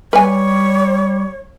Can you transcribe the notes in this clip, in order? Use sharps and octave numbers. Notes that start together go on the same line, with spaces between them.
G3 B4 C#5 G#5